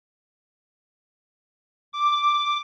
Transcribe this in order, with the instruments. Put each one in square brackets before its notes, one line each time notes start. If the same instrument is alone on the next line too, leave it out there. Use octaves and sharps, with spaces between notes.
[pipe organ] D6